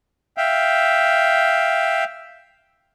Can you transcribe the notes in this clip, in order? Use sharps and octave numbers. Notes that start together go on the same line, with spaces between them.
E5 F5 G5